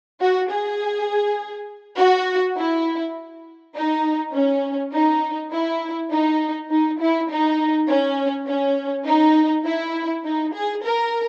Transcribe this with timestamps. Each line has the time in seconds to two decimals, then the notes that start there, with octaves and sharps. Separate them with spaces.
0.21 F#4
0.51 G#4
1.97 F#4
2.58 E4
3.75 D#4
4.34 C#4
4.93 D#4
5.52 E4
6.11 D#4
6.70 D#4
7.00 E4
7.30 D#4
7.88 C#4
8.48 C#4
9.07 D#4
9.66 E4
10.25 D#4
10.54 G#4
10.84 A#4